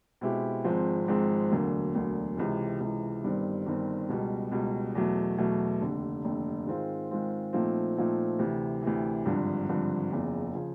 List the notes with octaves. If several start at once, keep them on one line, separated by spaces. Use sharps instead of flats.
B2 G#3 C4 E4 G4
G#1 G#2 F3 G#3 C4
G#1 G#2 F3 G#3 C4
E1 D2 D3 F#3 A#3
E1 D2 D3 F#3 A#3
C#2 C3 E3
C#2 C3 E3
G1 G2 D#3 G3 C4
G1 G2 D#3 G3 C4
C#2 B2 G3
C#2 B2 G3
E2 B2 F#3 A3
E2 B2 F#3 A3
F1 D#2 D3
F1 D#2 D3
G#2 D#3 G#3 C4 F4
G#2 D#3 G#3 C4 F4
A#2 F3 A3 C4 D#4
A#2 F3 A3 C4 D#4
D2 C3 E3
D2 C3 E3
G#1 G2 D3 F3
G#1 G2 D3 F3
F#1 E2 C#3 F3
C#3 F3